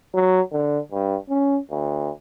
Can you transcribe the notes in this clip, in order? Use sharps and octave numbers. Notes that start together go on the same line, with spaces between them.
F#3
D3
G2
C#4
D2